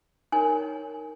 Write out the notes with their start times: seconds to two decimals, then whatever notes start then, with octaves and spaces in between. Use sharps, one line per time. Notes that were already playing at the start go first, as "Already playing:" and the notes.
0.32 D#4 A#4 C#5 G#5